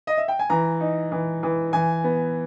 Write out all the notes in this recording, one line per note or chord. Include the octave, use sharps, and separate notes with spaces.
D#5
E5
G5
G#5
E3 A#5
D#4
E3
E3
E3 G#5
B3